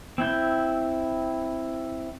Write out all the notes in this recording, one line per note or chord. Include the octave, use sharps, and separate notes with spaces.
C4 E4 G6